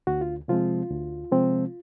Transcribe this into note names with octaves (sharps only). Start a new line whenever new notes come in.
D2 F#4
F4
C3 F3 G#3 C4 F4
D2
C3 F3 G#3 C4